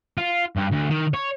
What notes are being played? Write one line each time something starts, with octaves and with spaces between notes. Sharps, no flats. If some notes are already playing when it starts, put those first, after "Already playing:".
F4
G2
D2
D#3
C#5